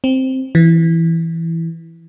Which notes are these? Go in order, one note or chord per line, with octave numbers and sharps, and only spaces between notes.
C4
E3